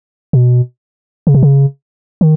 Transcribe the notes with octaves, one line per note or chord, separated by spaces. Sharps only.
B2
C#3
C3
C#3
D#3